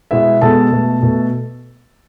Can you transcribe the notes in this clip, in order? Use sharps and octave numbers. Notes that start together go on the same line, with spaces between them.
B2 G#3 B3 E4 E5
B2 G#3 B3 A4 A5
B2 A3
B2 A3